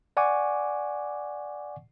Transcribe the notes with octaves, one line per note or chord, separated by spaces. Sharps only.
D5 F#5 G#5 C#6 D6